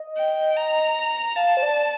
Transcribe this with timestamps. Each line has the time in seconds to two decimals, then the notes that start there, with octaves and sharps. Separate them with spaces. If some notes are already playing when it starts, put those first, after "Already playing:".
Already playing: D#5
0.17 G5
0.56 A#5
1.36 F5 A5
1.57 C5
1.62 D5